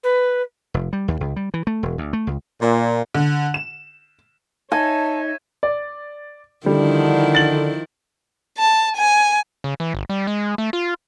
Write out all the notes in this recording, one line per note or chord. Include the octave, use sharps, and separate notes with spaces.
B4
F1
G3
D#2
C#2
G3
E3
A3
E1
D2
A3
C#2
A#2
D3
E7
D#4 C#5 E5 G#5 A5
D5
D3 D#3 F3 G3 E4
A6 F#7
A5
G#5
C#3
E3
G1
G3
G#3
A3
F4